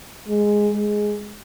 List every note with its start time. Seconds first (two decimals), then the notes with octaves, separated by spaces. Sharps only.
0.27 G#3
0.72 G#3